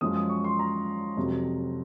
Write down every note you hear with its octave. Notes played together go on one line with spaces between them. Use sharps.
F#2 F3 G#3 D#6
D#6
C#6
C6
A#5
F2 C3 F#3